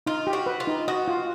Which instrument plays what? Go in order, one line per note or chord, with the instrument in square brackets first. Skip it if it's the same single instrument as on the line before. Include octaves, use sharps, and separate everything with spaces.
[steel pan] D#4 [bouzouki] F4
[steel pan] G4
[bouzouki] F#4
[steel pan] B4
[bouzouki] F4
[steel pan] D#4
[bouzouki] F#4 [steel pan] D#5
[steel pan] F4